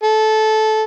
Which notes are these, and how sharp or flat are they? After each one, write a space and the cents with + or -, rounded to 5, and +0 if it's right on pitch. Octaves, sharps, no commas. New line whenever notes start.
A4 -15